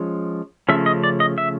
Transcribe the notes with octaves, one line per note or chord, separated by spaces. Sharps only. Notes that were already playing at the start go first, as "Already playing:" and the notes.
Already playing: F3 G#3 C#4
C#3 F3 A3 C#4 E5
D#5
D5
D#5
E5